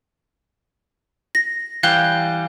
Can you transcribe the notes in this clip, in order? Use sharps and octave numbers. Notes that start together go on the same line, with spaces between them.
A#6
E3 G3 F5 G5 F#6